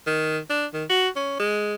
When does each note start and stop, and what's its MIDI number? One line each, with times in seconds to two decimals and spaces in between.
0.07 0.38 51
0.50 0.66 62
0.74 0.85 51
0.90 1.09 66
1.16 1.36 61
1.40 1.75 56